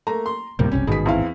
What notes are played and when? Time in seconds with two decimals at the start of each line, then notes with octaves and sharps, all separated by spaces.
0.07 A3 A#3 A#5
0.26 C6
0.59 D2 A2 C3 G3 A#3
0.72 F#1 B1 C3 C#4
0.87 A1 G#2 B2 D#3 G#4 B6
1.06 E2 C4 E4 F5